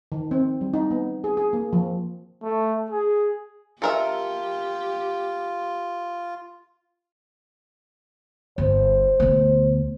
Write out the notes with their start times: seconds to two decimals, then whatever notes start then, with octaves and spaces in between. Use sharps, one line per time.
0.12 D#3
0.31 C4
0.61 G3
0.74 D#4
0.91 B3
1.24 G#4
1.37 G#4
1.53 A#3
1.73 F3
2.43 A3
2.91 G#4
3.82 F4 G4 A4 A#4 E5
8.58 G1 D4 C5
9.20 D2 B2